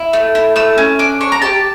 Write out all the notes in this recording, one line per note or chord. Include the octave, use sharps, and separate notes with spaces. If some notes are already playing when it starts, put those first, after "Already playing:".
Already playing: E4
A3
E4
A3 E6
C#4
D4 D6
D4 C#6
A#5
G4 A5